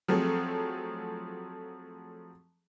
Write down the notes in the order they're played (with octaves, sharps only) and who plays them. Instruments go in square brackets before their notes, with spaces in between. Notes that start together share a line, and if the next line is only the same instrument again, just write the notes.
[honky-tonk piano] F3 F#3 A3 C4 G#4 A4